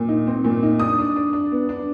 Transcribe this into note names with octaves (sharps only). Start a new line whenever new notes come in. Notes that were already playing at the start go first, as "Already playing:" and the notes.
Already playing: A#2
D#4
C4
A#2
D#4
D4 D#6
D4
D4
D4
B3
D4